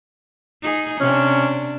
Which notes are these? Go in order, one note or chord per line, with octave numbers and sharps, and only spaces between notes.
D#4 G#4
C3 C#4 D4